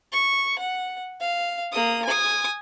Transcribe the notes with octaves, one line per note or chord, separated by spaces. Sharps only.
C#6
F#5
F5
A#3 D#6
G#5 D#6